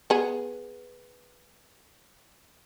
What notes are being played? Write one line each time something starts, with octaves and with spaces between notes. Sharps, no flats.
B3 G#4